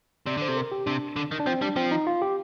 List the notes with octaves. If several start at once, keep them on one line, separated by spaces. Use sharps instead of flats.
C3 D5
D3 C5
C3 A4
A#4
G4
C3 D4
D3
D#3
D4
F3 C4
G3 D4
F3 C4
D#4
F4
G4